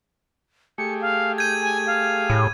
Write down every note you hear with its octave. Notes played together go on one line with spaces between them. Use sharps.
A3 G4 G#4 C#7
F5
G6 G#6 D#7
G#5
F5
A2